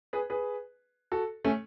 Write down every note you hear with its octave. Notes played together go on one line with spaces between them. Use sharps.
G#4 B4
G#4 B4
F#4 A4
A3 C#4